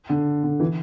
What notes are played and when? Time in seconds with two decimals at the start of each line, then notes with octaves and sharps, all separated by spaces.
0.09 D3
0.43 D3
0.60 E3